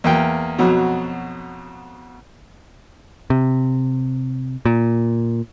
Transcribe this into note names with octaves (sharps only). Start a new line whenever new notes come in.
E2 A#3 G5
F2 B2 F#3
C3
A#2